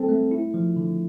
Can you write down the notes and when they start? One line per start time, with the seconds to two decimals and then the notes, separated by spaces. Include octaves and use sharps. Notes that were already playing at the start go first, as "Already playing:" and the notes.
Already playing: G3 C4 A4
0.09 A3
0.31 E4
0.54 F3
0.76 D3